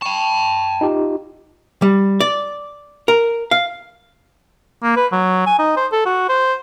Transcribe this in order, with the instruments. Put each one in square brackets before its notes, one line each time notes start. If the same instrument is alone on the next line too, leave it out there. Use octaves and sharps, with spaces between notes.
[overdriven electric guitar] G5 A5 [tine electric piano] C#6
[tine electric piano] D#4 F4 G4
[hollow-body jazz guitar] G3
D5
A#4
F5
[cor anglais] A#3
B4
F#3
G#5
D#4
C5
A4
F#4
C5